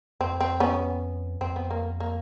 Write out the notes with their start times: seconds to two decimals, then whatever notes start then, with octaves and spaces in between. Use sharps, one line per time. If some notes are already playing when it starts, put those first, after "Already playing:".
0.20 F2 C4
0.40 C4
0.60 B3 C#4
1.41 F2 C4
1.56 B3
1.70 A#3
2.00 A#3